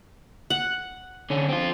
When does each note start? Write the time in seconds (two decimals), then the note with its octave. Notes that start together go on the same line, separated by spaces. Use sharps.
0.50 F#5
1.30 D3 C#4
1.49 C4 F4